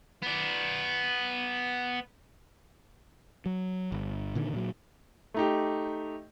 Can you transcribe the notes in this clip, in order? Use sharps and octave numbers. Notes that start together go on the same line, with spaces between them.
B3 D5
F#3
G1
A#2 D3 D#3
A#2 F#3
A3 D#4 G4